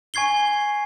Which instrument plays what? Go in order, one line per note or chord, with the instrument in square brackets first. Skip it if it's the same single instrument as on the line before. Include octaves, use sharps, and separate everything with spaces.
[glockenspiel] G#5 C#6 G#6 C7 G7